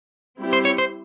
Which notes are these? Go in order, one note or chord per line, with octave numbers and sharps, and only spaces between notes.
G3 C4 E4 G4
C5
C#5
C5